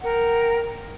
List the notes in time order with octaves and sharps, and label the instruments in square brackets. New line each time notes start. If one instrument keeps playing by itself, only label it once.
[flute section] A#4 F#5 G5